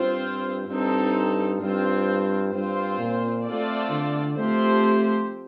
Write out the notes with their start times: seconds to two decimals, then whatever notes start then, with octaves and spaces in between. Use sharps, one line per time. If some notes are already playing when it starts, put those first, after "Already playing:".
Already playing: G2 C4 F4 C5
0.68 G2 C4 D#4 A4
1.61 G2 C4 F4 C5
2.53 G2 C4 F4 C5
2.99 A#2
3.45 A3 C4 F4 A4 D5
3.91 D3
4.37 F3 A3 C4 G4 C5